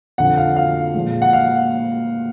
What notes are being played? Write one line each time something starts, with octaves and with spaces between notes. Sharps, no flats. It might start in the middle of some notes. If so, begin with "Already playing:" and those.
F2 D3 F3 F#5
F5
F5
A#2 F3 G#3
F#5
F5